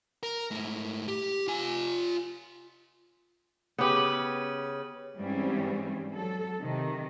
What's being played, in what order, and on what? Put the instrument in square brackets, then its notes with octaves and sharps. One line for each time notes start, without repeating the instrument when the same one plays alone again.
[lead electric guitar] A#4
G#2 A3
G4
F4 G#5
[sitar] C#3 B4 [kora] B3 G4
[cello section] G#2 E3 G3 C4 C#4
F#3 A4
C3 D#3